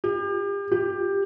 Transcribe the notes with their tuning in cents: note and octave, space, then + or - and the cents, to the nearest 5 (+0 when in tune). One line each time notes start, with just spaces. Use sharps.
G4 +35
G4 +15